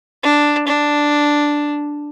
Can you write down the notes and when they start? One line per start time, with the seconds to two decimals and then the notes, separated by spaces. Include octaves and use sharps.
0.23 D4
0.68 D4